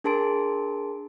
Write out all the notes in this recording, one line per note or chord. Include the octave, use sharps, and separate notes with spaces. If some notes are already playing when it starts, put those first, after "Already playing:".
D4 G#4 A#4 A5 C6 D7